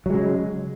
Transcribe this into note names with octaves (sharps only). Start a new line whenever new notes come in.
C#3 F#3 G#3